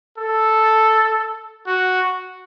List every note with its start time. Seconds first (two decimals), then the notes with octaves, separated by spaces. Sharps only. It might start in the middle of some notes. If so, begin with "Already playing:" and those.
0.18 A4
1.67 F#4